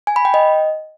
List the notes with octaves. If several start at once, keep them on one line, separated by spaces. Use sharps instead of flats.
G#5
B5
G5
D#5